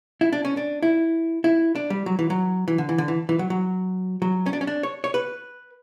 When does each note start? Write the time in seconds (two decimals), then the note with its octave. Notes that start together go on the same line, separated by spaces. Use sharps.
0.21 E4
0.33 D4
0.45 C#4
0.57 D4
0.83 E4
1.44 E4
1.75 D4
1.90 G3
2.06 F#3
2.19 E3
2.30 F#3
2.68 E3
2.78 D3
2.89 E3
2.98 D3
3.08 E3
3.29 E3
3.39 F#3
3.50 F#3
4.22 F#3
4.46 C#4
4.53 D4
4.61 C#4
4.67 D4
4.83 C#5
5.04 C#5
5.14 B4